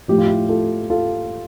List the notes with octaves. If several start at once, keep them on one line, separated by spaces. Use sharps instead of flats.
A2 F3 G4
F4
E4 G4
F4 A4
F4 A4